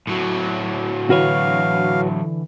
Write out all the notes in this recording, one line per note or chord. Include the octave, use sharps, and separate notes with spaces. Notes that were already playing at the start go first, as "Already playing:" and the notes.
A2 F#3
D3 E3 F#4 B4 C#5 F5